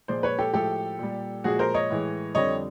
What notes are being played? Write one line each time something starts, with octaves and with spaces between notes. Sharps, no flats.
A#2 F3 G#3 C5 D5
B4 C#5
G4 A4
A2 F3 G#3 G4 A4
A#2 G3
A#2 F3 G#3 F#4 G#4
A#4 C5
C#5 D#5
A2 E3 G#3
F2 D3 G3 C#5 D#5